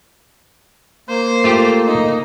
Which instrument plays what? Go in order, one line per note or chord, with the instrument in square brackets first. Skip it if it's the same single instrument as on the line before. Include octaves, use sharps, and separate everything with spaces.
[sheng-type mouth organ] A#3 [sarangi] C5
[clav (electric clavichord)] A3 F4 G4
[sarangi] D#4